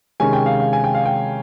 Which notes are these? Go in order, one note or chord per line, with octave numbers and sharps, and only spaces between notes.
C3 D#3 G#3 C#4 G#5
G5
F5
F5
G#5
G5
F5
G5